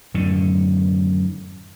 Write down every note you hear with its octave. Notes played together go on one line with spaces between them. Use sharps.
F#2 A2 D3 D#3